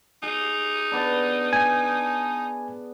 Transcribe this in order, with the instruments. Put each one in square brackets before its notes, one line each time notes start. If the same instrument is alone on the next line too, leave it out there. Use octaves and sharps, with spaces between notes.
[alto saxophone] D#4 [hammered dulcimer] G#4
[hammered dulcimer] B3 D4
[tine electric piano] G#5